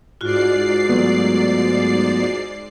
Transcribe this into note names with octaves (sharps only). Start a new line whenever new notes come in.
G#2 F4 F#4 D5 C7
F#3 A3 B3